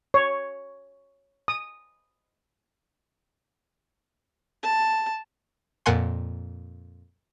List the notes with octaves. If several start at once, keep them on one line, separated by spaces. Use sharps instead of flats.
C#5
D#6
A5
F2 A#2 A#4 F#5 G#5 C6